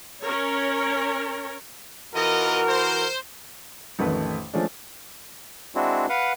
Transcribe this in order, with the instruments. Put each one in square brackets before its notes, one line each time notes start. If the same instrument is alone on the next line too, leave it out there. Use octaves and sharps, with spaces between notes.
[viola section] C#4 A#4 C#5
[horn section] E3 F#4 A#4 [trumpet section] B3 F4 D#5
[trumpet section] C5
[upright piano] A1 F2 D#3 A3 B4
F3 G#3 A3 C#4 D4
[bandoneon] G#3 C4 D4 E4 F#4
B4 F5 F#5